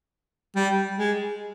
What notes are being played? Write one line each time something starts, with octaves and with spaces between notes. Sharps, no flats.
G3
G#3